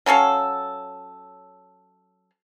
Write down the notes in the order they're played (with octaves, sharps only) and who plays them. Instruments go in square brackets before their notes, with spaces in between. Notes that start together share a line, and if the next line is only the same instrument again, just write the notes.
[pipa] F#3 C#4 A4 F5